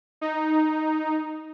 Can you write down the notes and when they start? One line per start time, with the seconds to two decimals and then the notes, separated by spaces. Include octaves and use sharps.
0.21 D#4